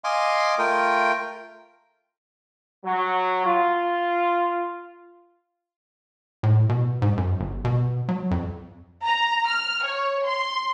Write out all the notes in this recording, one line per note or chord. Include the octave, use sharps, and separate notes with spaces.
D#5 F5 G#5 C6 D6
A3 F4 A#4 G5
F#3
F4
A2
B2
G#2
F#2
G1
B2
F#3
F2
A#5
F6
C#5
C6